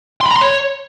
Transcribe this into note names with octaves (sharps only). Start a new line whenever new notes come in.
C6
B5
A#5
C6
C#5